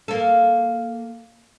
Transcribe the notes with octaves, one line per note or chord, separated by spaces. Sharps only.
A#3 A4